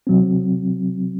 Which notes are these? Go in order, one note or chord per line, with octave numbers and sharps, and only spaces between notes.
C3 F#3 C4